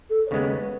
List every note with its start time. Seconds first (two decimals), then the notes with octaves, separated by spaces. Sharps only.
0.09 A4
0.26 C#5
0.30 D#2 C#3 G#3 B3 B4